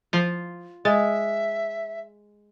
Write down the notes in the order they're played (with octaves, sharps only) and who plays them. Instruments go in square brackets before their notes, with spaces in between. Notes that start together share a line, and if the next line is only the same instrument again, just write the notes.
[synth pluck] F3 [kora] F4
[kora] G#3 [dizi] E5 [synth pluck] A6